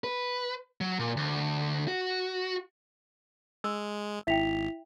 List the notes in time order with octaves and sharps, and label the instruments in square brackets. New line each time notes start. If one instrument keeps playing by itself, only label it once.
[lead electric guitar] B4
F#3
A#2
D2
F#4
[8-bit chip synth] G#3 [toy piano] E6
[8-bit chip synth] G#1 [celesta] E4 B6 F7 [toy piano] E5 G5